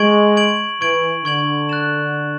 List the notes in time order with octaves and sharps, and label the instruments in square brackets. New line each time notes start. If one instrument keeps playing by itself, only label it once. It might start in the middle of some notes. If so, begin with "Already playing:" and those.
Already playing: [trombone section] G#3 [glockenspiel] C#6 G#6 D7 F#7
[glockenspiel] C#6 G#6 D7 F#7
[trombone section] E3 [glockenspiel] C#6 G#6 D7 F#7
[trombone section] D3 [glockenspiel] C#6 G#6 D7 F#7
[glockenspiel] F#6 A6 E7